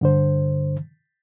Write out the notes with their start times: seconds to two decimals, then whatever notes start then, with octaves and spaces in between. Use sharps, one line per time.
0.01 G2 D3 C5